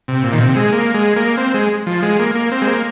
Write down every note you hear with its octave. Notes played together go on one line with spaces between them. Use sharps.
C3
A#2
D#3
C3
G#3
A#3
G#3
A#3
C4
G#3
F3
G#3
A#3
A#3
C4
G#3
A#3